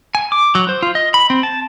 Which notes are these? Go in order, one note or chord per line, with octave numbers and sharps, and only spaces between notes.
G#5
D6
F#3
C5
F4
D#5
B5
C4
A5